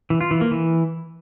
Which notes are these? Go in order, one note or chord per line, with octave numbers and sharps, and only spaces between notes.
E3
F4
E3
A#3
E3